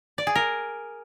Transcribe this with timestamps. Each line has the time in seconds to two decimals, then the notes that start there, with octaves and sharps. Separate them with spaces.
0.18 D5
0.27 G#4
0.35 A#4